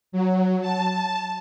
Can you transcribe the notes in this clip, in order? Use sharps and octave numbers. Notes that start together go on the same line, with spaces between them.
F#3
A5